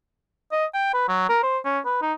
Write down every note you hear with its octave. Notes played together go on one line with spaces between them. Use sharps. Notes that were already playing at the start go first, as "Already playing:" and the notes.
D#5
G5
B4
F#3
A#4
C5
C#4
B4
D#4